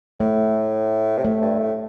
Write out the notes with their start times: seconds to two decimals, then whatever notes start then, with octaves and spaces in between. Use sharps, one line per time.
0.20 A2 A3
1.17 C3
1.24 A2 A3
1.42 G2
1.59 A2